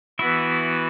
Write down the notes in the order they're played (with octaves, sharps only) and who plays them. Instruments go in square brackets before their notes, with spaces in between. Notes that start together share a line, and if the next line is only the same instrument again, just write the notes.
[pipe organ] E3 B3 F#4 [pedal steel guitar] E4 E5